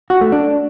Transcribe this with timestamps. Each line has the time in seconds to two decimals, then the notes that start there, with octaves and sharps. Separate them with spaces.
0.10 F#4
0.21 A3
0.32 D4